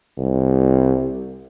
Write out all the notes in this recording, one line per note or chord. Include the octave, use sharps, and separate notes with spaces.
C2